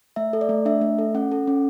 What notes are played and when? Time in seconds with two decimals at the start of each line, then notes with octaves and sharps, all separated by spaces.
0.16 A3 E5
0.33 A4
0.41 D5
0.49 A3
0.65 D4 E5
0.81 A3
0.99 A4
1.15 C#4 F#5
1.32 A4
1.47 C#4